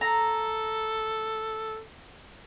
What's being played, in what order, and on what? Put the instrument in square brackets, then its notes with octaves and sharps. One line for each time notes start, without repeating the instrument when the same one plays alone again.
[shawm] A4 [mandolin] A#5